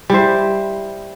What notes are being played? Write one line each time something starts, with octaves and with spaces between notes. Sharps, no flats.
G3 E4 C5